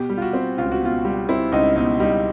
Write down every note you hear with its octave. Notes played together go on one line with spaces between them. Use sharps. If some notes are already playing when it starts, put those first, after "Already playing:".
Already playing: B2 G4
G3
F4
F#4
C4
C#2 F4
F#4
B2 F4
G3
C4 E4
C#2 D#4
B2 D#4
G3 D#4